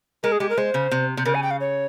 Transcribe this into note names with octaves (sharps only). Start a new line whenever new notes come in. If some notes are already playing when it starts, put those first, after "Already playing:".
G#3 A#4
G#4
G#3 G4
A#4
G#3 C5
C#3
C3
C3
C#3 A#4
G#5
G5
F5
C#5